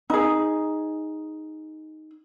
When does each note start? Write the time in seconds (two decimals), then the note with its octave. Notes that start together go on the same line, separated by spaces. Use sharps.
0.10 D#4 G#4